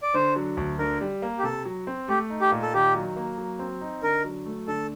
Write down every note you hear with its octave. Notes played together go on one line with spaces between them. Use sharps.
D5
D3 C5
F#3
D2
D3 A#4
G3
A#3
G4
C3 A4
F#3
C4
A3 G4
D#4
G4
A#2
A4
D#3 G4
F#3
A#3
F#3
C4
D#4
D3 A#4
F#3
A3
D3 A4